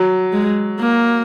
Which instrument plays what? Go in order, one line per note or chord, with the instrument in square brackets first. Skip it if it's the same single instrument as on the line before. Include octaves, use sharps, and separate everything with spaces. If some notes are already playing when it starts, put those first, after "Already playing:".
Already playing: [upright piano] F#3
[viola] G#3
A#3